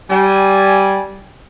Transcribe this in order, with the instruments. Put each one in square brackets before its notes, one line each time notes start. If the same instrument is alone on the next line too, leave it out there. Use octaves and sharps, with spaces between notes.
[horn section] G3 G#5